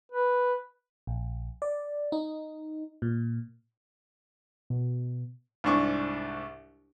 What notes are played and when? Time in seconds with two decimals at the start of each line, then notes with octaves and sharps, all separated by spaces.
0.12 B4
1.07 A#1
1.62 D5
2.12 D#4
3.02 A#2
4.70 B2
5.64 C2 G#2 D4 C#6